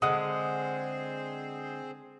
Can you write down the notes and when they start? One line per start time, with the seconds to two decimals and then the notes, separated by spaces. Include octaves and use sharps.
0.02 D3 G#3 C4 G#4 C5 F#5 D#6